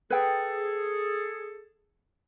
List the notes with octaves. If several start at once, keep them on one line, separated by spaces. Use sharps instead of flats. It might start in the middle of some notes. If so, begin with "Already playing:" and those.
G#4 A4 B4 G5